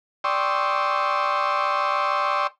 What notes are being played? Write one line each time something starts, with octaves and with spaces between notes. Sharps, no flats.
D5 G5 C6 C#6 D#6 E6